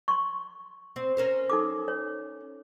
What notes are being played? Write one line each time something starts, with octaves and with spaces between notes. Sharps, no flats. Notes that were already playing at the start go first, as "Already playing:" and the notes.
C6 C#6
C4
C#4 A#4 C5
D#4 A4 D6
C#5